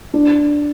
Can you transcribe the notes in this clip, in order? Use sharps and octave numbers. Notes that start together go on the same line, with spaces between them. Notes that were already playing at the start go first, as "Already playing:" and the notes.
D4